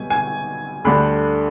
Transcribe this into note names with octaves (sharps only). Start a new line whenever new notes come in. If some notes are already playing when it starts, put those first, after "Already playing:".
Already playing: B1 B2 G3 B3 G#5
G#5
D2 D3 G3 D4 B5